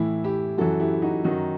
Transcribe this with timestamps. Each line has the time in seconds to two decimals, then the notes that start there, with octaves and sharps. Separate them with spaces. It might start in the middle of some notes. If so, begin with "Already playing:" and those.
Already playing: A2 E3 E4
0.24 E4 G4
0.58 F#2 E3 F#4 A4
0.80 E4 G4
1.02 D#4 F#4
1.24 F#2 D#3 D#4 F#4